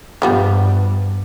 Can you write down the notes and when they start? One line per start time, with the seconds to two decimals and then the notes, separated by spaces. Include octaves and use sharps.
0.22 G2 F3 G3 B3